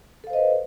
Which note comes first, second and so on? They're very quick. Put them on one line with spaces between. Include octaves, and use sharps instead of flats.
A4 F5 C5 D#5 B4